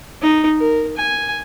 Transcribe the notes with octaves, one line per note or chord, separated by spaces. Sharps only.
D#4
A#4
G#5